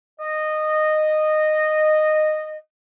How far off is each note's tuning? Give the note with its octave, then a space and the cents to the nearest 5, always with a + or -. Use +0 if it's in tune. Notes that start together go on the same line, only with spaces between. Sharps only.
D#5 -15